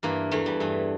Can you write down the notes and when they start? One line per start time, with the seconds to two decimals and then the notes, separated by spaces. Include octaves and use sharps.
0.03 G2 E3 A#3
0.31 E2 E3 A3
0.46 G3
0.60 G2 E3